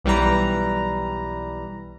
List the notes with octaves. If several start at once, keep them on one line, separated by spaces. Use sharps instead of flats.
B1 E3 G3 B4 A#5